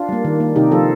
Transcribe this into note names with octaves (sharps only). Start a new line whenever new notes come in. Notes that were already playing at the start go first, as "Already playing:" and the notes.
Already playing: D4 F4
G3 A#3
D#3
A#3
C3 D#4 G4
F3 A#3 F4 A4